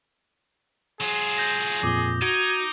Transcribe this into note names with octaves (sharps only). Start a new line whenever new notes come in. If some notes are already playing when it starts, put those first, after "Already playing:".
F#3 F4 G#4
G6 A#6
F2 A#2 D6 D#6 G7
D#4 F#4 G#6 D7 G7